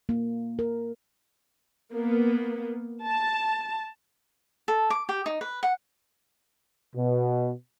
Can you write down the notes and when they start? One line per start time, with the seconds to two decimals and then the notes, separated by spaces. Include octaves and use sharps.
0.09 A#3
0.59 A#4
1.92 A#3 B3
3.07 A5
4.68 A4
4.90 D6
5.09 G4
5.26 D#4
5.41 B4
5.63 F#5
6.96 B2